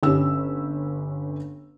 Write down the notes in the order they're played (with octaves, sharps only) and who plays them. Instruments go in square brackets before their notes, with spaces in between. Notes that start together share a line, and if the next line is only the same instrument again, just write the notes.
[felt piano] G1 C#4 G4 E6